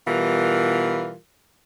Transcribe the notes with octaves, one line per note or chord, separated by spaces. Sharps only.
B2 E3 G3 F4 A#4